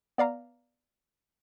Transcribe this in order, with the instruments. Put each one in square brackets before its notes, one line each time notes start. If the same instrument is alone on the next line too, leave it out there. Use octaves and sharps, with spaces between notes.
[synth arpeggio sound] B3 D5 F5 A#5